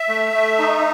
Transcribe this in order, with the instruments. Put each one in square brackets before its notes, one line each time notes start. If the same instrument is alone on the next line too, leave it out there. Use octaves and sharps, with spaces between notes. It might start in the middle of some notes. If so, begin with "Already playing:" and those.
Already playing: [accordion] E5
A3
A3
D#4